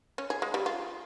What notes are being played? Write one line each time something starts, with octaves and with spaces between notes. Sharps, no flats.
C#4
G#4
G#3
G3
F4